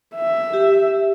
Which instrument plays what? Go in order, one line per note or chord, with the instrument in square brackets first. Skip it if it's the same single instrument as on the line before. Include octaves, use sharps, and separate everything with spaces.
[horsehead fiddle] E5
[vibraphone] G4